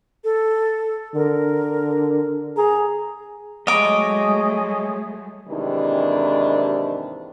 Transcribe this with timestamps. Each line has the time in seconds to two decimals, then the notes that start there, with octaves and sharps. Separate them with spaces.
0.24 A4
1.15 D3 A#4
2.57 G#4 A#5
3.67 F#3 G#3 A3 G#4 C#5 D#5 D6
5.49 D#2 G#2 C3 D#3 E3 D4